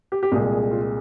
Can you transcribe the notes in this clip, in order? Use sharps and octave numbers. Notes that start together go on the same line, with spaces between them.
G4
G4
C2 A#2 G#3 G#4
G#4
F4